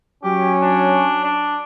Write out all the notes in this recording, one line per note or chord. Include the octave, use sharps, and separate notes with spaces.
F#3 C#4 G4
D4
D4